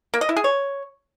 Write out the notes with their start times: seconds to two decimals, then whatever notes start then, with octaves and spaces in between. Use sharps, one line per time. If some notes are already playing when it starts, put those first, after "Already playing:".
0.14 A#3
0.21 D#5
0.29 E4
0.36 G#4
0.44 C#5